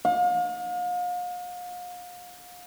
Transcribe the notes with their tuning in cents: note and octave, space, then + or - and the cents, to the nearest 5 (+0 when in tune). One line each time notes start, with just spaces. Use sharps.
F5 +40